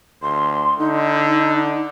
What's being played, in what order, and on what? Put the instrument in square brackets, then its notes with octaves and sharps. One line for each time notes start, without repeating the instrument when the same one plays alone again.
[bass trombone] D2 [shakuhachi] C6
[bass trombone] D3 [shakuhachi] D#4